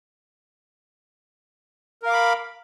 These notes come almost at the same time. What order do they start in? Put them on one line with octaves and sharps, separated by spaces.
A#4 F5 D6 B5